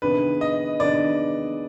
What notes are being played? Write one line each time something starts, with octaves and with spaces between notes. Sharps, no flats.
C3 D#3 B3 D4 G#4 B4
D#5
C3 D#3 B3 D4 G#4 D5